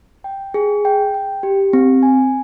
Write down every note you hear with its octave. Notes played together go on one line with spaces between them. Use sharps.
G5
G#4
G5
G5
G4
C4
G#5